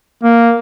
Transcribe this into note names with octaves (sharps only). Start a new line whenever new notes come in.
A#3